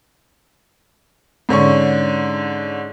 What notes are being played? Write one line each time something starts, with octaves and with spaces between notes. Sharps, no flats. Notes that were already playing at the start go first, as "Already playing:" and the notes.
G#2 D3 C#4 C#6